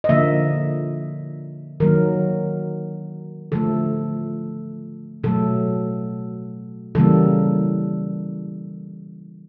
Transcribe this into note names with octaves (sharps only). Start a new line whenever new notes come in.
D#5
D3 F3 A#3 E5
D#3 F#3 A#3 A#4
D3 F3 A3 A4
B2 F#3 A3 A4
C#3 E3 G3 A#3 A4